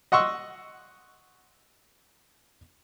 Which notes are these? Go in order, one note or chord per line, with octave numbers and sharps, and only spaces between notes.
D#5 F#5 C6 C#6 E6